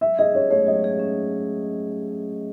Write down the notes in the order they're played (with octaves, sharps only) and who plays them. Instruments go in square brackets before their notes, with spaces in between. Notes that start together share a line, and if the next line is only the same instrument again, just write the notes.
[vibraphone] F#3 [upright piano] E5
[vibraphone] G#4 [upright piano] D#5
[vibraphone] C#4 [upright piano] C#5
[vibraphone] A3 [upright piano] C#5
[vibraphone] F#3 [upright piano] D#5
[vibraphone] G#4
C#4